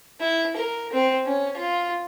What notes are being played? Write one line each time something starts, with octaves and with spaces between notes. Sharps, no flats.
E4
A#4
C4
C#4
F4